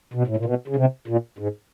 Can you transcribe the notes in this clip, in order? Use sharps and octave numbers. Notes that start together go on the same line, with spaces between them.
B2
A2
A#2
B2
C#3
C3
A#2
G#2